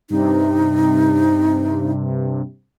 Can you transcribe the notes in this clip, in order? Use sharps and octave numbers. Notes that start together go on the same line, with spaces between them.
G2 C3 D#4